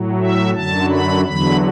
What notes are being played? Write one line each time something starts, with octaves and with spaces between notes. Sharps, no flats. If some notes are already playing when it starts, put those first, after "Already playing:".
Already playing: A2 F#3
E5
F#2 D3 F#3 A5
B5
E2 D3 F#3 B5